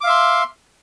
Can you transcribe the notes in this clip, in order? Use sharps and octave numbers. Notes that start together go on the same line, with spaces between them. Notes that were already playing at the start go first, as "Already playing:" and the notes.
E5 F5 C6 D6